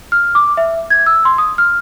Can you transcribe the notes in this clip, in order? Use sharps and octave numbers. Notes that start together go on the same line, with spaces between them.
F6
D6
E5
G#6
E6
C6
D#6
F6